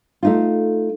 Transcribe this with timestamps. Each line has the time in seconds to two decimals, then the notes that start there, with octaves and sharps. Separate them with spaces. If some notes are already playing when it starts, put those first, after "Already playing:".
0.23 A3 D#4 F4